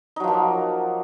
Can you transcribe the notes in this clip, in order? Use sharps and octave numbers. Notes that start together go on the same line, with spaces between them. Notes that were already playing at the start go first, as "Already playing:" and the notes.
F3 F#3 A#3 D#4